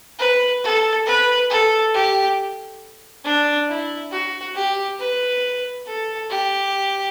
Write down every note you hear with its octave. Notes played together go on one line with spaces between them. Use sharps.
B4
A4
B4
A4
G4
D4
E4
F#4
G4
B4
A4
G4